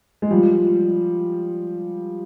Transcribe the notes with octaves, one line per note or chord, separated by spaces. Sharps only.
G#3
F3 G3